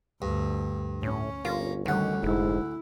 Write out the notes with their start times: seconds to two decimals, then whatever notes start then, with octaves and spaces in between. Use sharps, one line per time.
0.22 D2 G2
1.03 A2 C#4
1.45 G1 A#3 F4
1.86 D2 D#3 G3 C#4 F#5
2.23 F1 G#2 E4